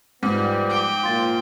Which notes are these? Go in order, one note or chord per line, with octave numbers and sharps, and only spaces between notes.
G#2 F3 G3 B3 F6
G5 D6
A#2 F3 F4 C6 A6